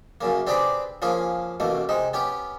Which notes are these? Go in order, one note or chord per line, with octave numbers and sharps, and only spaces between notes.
F#2 C#3 A#3
C4 D4 G4 G#4 B4 D5
F3 A#3 C#4 G#4
A1 B2 A3 A#3
C3 G#3 D#4
B3 C#4 G4